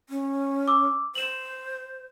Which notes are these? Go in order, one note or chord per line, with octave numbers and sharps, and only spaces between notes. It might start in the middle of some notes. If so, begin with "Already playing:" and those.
C#4
D6 E6
C5 E7 F#7